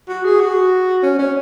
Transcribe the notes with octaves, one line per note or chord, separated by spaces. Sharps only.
F#4
G#4
F#4
C#4
C#4